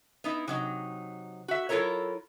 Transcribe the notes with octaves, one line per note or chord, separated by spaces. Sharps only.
B3 D#4 E4
C3 F#3 D#4
F#4 E5
F#3 E4 F4 A4 A#4 C#5